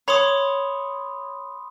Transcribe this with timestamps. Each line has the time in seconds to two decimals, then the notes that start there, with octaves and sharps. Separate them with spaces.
0.08 C#5 B5 C6 D#6